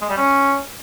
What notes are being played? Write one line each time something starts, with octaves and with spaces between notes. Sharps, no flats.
G#3
G3
C#4